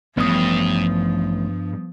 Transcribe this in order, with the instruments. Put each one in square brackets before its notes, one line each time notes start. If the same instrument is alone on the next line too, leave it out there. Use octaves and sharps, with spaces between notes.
[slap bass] A1 [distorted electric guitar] G2 [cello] F3 [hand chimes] B3 D#6